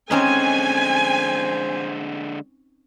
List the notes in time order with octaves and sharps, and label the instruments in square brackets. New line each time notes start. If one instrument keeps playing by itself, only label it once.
[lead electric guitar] D3 G#3 [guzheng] C4 C#4 D#4 [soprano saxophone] C5 [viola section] G#5